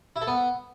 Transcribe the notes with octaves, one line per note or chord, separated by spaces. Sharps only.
E4
A4
B3